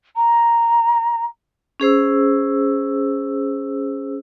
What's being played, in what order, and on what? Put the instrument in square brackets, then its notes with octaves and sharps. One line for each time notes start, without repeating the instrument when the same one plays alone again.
[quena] A#5
[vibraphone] C#4 G#4 C5 E6